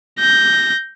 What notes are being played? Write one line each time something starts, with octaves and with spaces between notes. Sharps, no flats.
G6 A#6